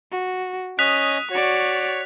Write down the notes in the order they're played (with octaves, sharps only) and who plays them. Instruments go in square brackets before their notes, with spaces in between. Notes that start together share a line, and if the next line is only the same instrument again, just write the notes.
[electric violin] F#4
[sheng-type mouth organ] C#4 D#5 [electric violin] D#6 [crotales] F#6 B6 F7
[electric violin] F#4 D5 [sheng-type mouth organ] C#5